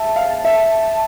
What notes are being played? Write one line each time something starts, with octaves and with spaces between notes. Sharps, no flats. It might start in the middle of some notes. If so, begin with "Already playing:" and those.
Already playing: E5 A5
F5
E5